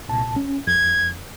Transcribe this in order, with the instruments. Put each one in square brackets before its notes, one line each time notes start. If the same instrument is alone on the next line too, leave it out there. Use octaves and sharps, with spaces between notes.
[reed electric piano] C2 A#2 A5
C#4
[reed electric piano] F2 [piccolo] G#6